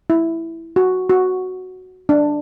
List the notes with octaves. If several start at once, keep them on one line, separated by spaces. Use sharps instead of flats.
E4
F#4
F#4
D4